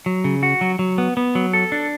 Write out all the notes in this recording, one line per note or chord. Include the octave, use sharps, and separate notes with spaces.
F#3
C#3
F#4
F#3
F#3
B3
B3
F#3
A4
D4